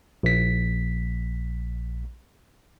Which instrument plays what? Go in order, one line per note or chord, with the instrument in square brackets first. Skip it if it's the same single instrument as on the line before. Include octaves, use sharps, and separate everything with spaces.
[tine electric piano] A#1 B6